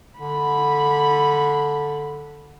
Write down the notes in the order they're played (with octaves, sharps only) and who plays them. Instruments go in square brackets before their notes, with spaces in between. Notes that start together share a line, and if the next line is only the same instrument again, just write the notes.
[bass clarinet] D3 [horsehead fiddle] B5